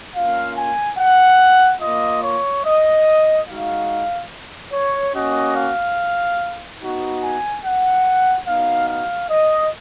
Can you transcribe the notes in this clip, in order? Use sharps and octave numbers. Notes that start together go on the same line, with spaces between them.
A#3 C#4 F4 F5
G#5
F#5
A#3 F4 D#5
C#5
D#5
G#3 D#4 F#4 F5
C#5
A#3 C#4 F#4 D#5
F5
B3 D#4 F#4
G#5
F#5
B3 D#4 F#4 F5
F5
D#5